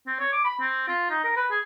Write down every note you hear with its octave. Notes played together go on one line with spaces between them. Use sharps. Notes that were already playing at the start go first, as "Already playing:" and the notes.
C4
C#5
D6
B5
C4
F4
D#4
A#4
B4
G#4